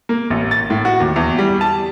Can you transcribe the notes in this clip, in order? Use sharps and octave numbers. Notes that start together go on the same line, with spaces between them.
A#3
A1
A6
A2
F#4
D#2
E2
G3
A5